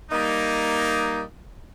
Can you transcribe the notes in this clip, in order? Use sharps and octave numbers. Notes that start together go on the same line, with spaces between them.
G3 A#3 D#4